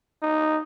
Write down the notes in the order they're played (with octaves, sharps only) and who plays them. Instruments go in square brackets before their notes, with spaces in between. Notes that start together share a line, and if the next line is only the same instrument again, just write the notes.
[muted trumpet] D#4